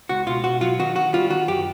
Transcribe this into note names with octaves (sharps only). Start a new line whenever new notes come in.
C#2 F#4
B2 F4
B2 F#4
F#3 F4
D#3 F#4
D#3 F#4
G3 F4
D#3 F#4
F#2 G4